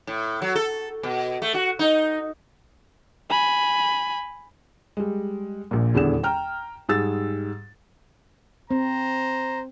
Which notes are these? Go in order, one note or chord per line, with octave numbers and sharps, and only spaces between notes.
A2
F#3
A4
B2
A3
F#4
D#4
G#5 B5
G3 G#3
A#1 A#2
D#1 E2 D3 G#4 E7
G5 A#5 F6
G#2 G3 G#4 E6 A6
C4 C5 A#5